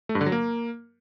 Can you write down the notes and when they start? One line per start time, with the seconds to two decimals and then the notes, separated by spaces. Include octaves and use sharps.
0.09 A3
0.15 G2
0.21 D3
0.26 F#3
0.32 A#3